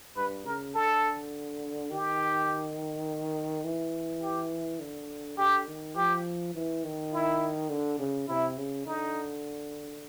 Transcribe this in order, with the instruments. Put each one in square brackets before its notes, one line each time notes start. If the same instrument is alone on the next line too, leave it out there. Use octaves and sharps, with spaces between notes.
[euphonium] G2 [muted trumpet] B4
[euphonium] C#3 [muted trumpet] A#4
[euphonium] D3 [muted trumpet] A4
[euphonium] D#3 [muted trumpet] G4
[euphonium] E3
[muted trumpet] G4
[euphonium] D3
[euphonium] D3 [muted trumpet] G4
[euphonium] D#3
[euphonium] F3 [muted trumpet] G4
[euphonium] E3
D#3
[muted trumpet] E4
[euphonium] D3
C#3
[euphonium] C3 [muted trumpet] E4
[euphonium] C#3
[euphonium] D3 [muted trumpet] D#4